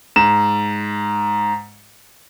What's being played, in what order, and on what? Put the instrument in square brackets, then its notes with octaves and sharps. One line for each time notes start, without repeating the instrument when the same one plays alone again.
[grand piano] G#2 E7